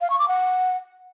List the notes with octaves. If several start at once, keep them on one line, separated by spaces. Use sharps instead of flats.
F5
C#6
D6
F#5